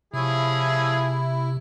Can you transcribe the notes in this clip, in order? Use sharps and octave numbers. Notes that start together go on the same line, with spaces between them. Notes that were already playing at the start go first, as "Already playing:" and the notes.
C3 F3 E4 G#4 C#5 E5